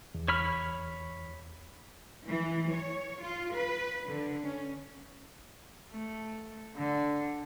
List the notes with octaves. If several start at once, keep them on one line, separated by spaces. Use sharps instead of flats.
E2
C#5 B5 F6
E3
C#5
F4
B4
D3
C#4
A3
D3